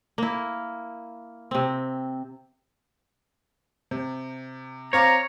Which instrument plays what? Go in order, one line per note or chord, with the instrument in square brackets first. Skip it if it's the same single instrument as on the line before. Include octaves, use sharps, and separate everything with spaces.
[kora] A#3 E4
C3 C4
[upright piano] C3
[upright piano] C4 F5 D6 [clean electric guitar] C#5 [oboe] A#5